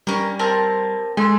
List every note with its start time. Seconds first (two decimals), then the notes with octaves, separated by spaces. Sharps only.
0.07 G3 C#4 A#4
0.39 C4 A#4 A5
1.17 G#3 A4 G#5 C6